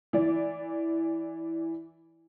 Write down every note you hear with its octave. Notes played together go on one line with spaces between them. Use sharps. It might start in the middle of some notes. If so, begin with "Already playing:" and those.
E3 D5